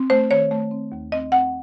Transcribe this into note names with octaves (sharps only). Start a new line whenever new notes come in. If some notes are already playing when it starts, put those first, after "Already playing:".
Already playing: C4
A3 C5
D#3 C#5
A3
C4
D#2
C4 D#5
C4 F#5